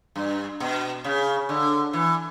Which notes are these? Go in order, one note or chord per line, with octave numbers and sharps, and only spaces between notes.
G2
B2
C#3
D3
E3